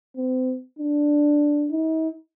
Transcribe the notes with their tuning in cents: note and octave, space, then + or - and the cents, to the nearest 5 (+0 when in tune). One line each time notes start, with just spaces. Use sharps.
C4 -35
D4 +0
D#4 +45